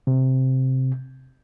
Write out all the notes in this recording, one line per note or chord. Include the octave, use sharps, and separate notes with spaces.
C3